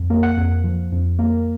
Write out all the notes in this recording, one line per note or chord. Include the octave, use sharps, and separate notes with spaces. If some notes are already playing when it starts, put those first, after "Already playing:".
Already playing: F2
A#3
F#5
F2
F3
F2
A#3